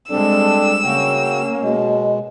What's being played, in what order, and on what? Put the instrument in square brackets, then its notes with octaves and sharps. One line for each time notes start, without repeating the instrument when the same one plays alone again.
[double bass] G3 G#3 [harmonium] C4 A4 [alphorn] D4 [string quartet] E6
[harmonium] C#3 F#4 G5 [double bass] A#3 [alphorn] C#4
[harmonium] B2 G#3